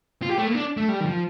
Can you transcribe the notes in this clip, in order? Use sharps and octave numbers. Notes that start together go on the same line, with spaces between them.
F4
G4
A3
A#3
D4
A3
G3
D#3
F3